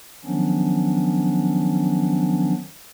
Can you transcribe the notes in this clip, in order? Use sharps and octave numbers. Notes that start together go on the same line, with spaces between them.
D#3 F3 F#3 B3 C#4 D4